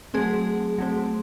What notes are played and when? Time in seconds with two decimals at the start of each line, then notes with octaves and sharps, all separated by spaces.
0.14 F#3 A3 C4 G#4
0.78 F#3 A3 C4